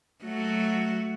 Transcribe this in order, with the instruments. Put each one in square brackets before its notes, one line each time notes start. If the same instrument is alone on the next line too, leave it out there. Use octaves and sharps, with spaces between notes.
[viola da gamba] F#3 A3 F#4